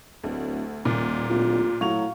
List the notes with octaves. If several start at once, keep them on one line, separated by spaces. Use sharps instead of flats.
D1 D2
D#1 A#2
D1 F4
A2 F#3 F5 C#6 F7